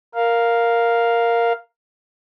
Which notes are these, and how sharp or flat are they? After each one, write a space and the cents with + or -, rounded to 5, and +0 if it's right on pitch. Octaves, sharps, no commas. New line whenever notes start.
A#4 +0 F5 +0